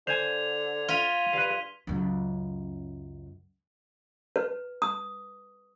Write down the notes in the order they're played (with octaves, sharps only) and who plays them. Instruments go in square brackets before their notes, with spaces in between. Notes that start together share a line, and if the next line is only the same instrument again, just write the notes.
[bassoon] D3 [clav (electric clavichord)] C5 G#5 [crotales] G#6 F7
[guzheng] F4 [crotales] B6 D#7 G7
[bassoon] G2 [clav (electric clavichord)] B4 F5
[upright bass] C#2 F#2
[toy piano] B4
D#6